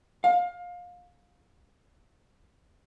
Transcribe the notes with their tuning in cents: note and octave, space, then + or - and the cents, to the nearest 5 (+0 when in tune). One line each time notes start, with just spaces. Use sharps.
F5 +25